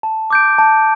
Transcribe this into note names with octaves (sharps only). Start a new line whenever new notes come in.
A5
D6 G6 D7
A5